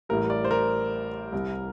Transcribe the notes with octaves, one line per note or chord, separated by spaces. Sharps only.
A1 A2 G3 A#4
D5
C5
A#4
C2 C3 G3